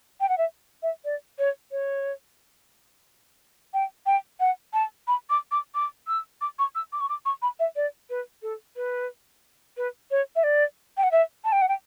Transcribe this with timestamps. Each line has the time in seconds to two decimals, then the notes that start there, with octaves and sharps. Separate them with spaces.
0.20 G5
0.29 F#5
0.38 E5
0.83 E5
1.05 D5
1.39 C#5
1.71 C#5
3.74 G5
4.06 G5
4.40 F#5
4.73 A5
5.07 B5
5.30 D6
5.51 D6
5.75 D6
6.07 E6
6.41 D6
6.59 C#6
6.75 E6
6.92 D6
7.00 C#6
7.09 D6
7.25 C#6
7.42 B5
7.59 E5
7.76 D5
8.10 B4
8.42 A4
8.76 B4
9.77 B4
10.11 C#5
10.36 E5
10.43 D5
10.97 G5
11.03 F#5
11.11 E5
11.44 A5
11.52 G5
11.62 F#5
11.69 G5